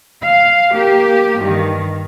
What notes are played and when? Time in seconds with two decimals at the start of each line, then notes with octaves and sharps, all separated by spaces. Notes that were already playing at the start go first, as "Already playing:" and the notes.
0.22 F5
0.73 A#3 G4
1.40 G2 D#3